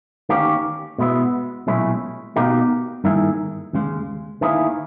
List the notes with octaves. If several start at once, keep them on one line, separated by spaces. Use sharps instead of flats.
D#3 A#3 C#4 G4
B2 G#3 B3 E4
B1 A#2 G#3 C#4 E4
B2 A#3 D#4 G4
G2 D#3 A#3 E4 G#4
D#2 C#3 G#3
D#3 A#3 E4 G#4